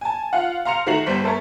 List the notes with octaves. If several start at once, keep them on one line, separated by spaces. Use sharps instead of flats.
G#5 A5
F4 F5 F#5
F5 A#5 C6 C#7 F7
D#3 A3 F#4 A#5 C7 F#7
G1 G3 C5 B6
A3 A4 A#4 C#5